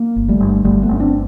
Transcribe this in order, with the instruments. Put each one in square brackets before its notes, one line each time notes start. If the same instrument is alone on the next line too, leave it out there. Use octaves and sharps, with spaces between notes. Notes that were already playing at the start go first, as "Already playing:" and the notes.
Already playing: [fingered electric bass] A#3
G1
G3 A3
G1
G1 G3 A3
A3 B3
G1 C#4
C4 D4